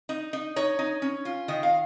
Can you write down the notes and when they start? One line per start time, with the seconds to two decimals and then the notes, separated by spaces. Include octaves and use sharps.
0.09 D#4
0.33 D#4
0.56 D#4 C#5
0.79 D#4
1.02 C#4
1.25 F4
1.48 D#3 D#5
1.63 F5